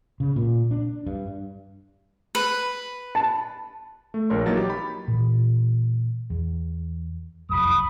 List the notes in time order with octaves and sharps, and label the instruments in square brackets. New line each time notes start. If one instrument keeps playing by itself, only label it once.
[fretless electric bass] C#3
A#2
D4
G2
[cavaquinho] B4
[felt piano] A5
[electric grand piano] A3
A#1 A#4 C#5 C6
E3 F#3 A#3 D#4 A6
G4
B5
[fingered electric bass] A#2 E3
E2
[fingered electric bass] F1 C2 F#2 [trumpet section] B5 D#6